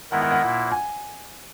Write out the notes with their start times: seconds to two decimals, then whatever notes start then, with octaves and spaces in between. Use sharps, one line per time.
0.11 D#3 G#3 B3 E4 A#4 F#5
0.22 F#5
0.32 F#5
0.42 A#2 A#3 E4 F#5
0.72 G#5